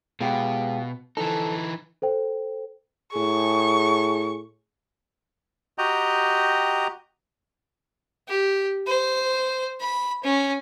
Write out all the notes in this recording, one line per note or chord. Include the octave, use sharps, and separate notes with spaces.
B2 G#3 F4 G4
E3 F3 D#4 A4
A4 C5 G5
A2 G#4 C#6
F#4 G4 D#5 G5 A#5
G4
C5
B5
C#4